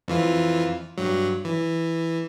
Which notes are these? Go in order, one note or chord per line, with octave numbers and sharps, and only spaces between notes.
F2 E3 F4
G2 F#3
E3